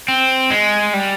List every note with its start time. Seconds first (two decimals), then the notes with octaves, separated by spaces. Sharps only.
0.08 C4
0.50 G#3
0.93 G3